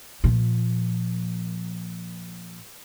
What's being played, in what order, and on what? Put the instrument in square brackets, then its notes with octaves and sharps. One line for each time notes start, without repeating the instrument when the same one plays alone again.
[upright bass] A#2 F3